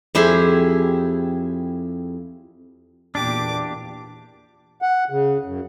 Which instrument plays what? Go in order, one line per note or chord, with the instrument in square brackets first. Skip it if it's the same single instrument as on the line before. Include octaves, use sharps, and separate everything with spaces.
[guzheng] F2 E4 G4 G#4 C6
[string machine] E2 A#2 [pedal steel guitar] D4 G4 [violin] D6
[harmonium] F#5
C#3
F#2